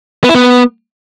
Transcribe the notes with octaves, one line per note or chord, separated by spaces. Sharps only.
B3
E4
B3